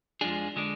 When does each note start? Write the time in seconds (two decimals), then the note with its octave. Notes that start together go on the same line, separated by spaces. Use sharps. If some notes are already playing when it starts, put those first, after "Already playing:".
0.21 F2 F3 G#3 D4 G#4
0.56 D3 G#3 D4